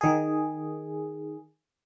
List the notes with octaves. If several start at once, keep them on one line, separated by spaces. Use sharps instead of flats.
D#3 G#4